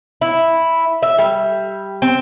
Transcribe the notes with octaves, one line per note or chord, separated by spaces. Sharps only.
E4
E5
G3
C4